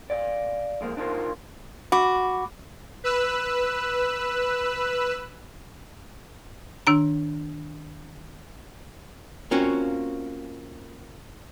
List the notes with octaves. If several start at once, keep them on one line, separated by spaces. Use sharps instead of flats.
D5 F5
F2 G#3 A#3 C4
D4 D#4 F4 G4 A#4 C5
F#4 B5 D6
B4 E6 F#6
D#3 D4 A#5
A#3 C4 C#4 F4 F#4